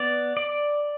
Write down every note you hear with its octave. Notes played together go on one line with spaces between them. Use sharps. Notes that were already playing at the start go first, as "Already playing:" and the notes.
Already playing: B3 D5
D5